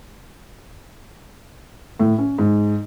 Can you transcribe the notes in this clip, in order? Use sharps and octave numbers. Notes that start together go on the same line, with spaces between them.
A2
C#4
G#2